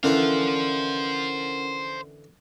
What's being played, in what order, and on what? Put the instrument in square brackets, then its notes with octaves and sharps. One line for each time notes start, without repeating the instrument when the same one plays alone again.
[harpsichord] D3 E3 E4 [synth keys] C#4 A#4 F#5 [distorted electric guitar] C5 F5